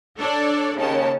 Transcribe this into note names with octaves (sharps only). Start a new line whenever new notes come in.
D4 A4 C#5 D5
D#2 C#3 C#4 A5